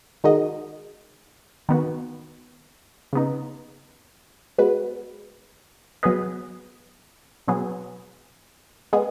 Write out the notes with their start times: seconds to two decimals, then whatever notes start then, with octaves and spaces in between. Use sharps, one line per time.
0.24 D#3 G#3 D#4 F#4 D#5
1.69 D#3 B3 F#4
3.13 C#3 B3 D#4
4.58 G#3 B3 F#4 B4
6.03 F#3 B3 G#4 B4 D#5
7.48 B2 F#3 B3 G#4
8.93 G#3 B3 G#4